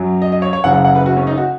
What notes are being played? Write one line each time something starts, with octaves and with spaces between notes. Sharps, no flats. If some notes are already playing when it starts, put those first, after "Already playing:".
Already playing: F#2 F#3
D#5
D#5
C#5
C#5
F#1 F#2 C#3 F#5
F#5
F#5
B4
F#4
C#4
D#4
F#4